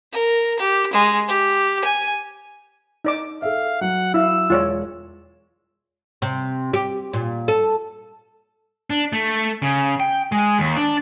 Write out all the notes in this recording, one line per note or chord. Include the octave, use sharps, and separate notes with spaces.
A#4
G4
G#3
G4
G#5
D#4 D5 D6
A4 E5 F5
F#3 F#5
E4 F5 E6
E1 F4 C#5 D5
C3
G4
A#2
A4
D4
A3
C#3
G5
G#3
D#2
D4